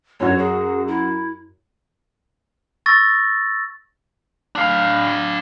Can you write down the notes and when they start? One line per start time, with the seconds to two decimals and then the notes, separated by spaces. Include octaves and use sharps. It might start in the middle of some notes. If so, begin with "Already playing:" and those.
0.20 F#2 F#4 C#5
0.38 G#4
0.88 E4
2.86 C#6 E6 A6 A#6
4.55 D4 F5